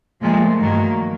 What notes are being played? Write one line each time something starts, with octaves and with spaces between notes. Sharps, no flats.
A#2 F3 G#3 A3
G2 D#3 F#3 A3 A#3